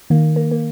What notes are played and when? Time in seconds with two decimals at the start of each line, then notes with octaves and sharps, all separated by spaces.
0.10 D#3 A#3
0.36 A#3
0.51 A#3